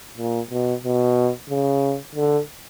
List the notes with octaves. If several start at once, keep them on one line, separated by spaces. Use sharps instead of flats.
A#2
B2
B2
C#3
D3